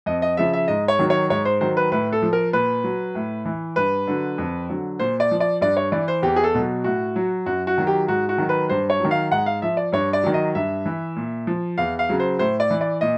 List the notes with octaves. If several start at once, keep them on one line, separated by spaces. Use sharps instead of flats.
F2 D#5
D#5
C#3 F3 E5
E5
G#2 D#5
C#5
D#3 F#3
C#5
G#2 C#5
C5
D#3 F#3 C5
B4
A2 B4
A4
F3
A#4
A#2 B4
F#3
A2
E3
G2 B4
D3 F#3
F2
D3 F#3
A#2 C5
D5
F3
D5
G2 D5
C#5
E3 D5
C5
E2 G4
G#4
A4
B2 F#3
A2 F#4
F#3
F#2 F#4
F#4
D#3 F#3
G4
G#2 F#4
F#4
D#3 F#3
B4
G2 C5
C#5
D#3 F#3
F5
G#2 F#5
F5
F3 E5
D5
G2 C#5
D5
D#3 F#3
D#5
G2 E5
E3
A#2
F3
E2 F5
F5
C#3 F#3
C5
A2 C5
D5
E3
D5
A#2 D#5